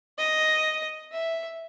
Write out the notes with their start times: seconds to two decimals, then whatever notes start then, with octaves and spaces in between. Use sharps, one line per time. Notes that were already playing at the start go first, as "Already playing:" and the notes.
0.18 D#5
1.12 E5